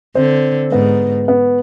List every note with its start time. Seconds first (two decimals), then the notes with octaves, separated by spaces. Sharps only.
0.15 D3 C4
0.72 G#2 B3
1.28 B3